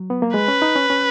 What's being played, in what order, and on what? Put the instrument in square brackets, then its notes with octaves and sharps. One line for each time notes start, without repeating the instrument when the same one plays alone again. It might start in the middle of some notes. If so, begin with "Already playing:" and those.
Already playing: [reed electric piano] F#3
B3
A#3
[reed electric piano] G#3 [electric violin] B4
[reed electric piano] C#4
D#4
C#4
C#4